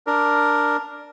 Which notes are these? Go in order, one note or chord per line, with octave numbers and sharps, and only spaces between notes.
D4 A#4